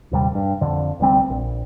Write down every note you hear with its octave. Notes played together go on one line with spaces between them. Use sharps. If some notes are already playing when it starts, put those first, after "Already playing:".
D#1 D#2 C3 G3
G2
F2 D3
F1 D2 G3 C4
A#1